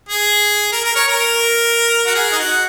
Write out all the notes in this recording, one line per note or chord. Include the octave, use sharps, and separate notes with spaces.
G#4
A#4
A#4
C#5
A#4
F#4
G#4
D#4
F#4